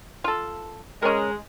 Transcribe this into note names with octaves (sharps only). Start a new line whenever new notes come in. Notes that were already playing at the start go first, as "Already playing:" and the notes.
F4 A4
G#3 C#4 A#4